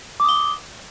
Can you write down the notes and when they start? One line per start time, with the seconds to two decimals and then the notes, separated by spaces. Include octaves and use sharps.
0.20 D6
0.24 D#6
0.29 G7